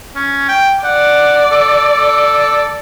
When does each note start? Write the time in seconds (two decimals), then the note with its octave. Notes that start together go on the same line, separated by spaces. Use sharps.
0.15 C#4
0.49 G5
0.84 D5 F#5
1.51 A4
1.93 A4